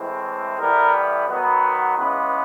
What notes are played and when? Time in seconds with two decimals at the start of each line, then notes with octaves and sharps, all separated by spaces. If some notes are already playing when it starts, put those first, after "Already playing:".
Already playing: A2 E3 G#3 C4
0.58 A2 E3 G3 B3 A#4
1.28 D#3 F#3 B3
1.62 B4
1.97 C#3 E3 G#3 B3 B4